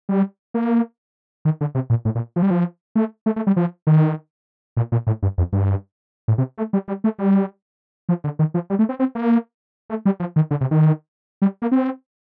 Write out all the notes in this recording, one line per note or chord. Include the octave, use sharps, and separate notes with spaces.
G3
A#3
D#3
D3
C3
A#2
A2
A#2
F3
G3
F3
A3
A3
A3
G3
F3
D#3
A#2
A#2
A2
G2
F2
G2
A2
C3
A3
G3
G3
A3
G3
F3
D3
D#3
F3
G3
A3
C4
C4
A#3
A3
G3
F3
D#3
D3
C3
D#3
G3
A#3
C4